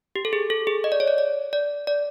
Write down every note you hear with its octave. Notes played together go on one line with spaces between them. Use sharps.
G4
A4
G#4
A4
G#4
D#5
D5
C#5
D5
D5
D5
D5